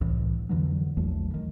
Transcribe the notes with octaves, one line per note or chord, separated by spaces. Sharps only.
C2 A2 E3
F2 D3 E3 F#3
A#1 E2 F#3 A3
D#3 E3